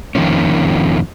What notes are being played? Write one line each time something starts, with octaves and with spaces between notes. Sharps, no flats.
F2 D#3 F3 A#3 C#4